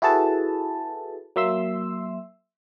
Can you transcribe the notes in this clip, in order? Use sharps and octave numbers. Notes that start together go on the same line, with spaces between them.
E4 F#4 G#4 A4 B4 A5
F#3 A#3 E5 C6 E6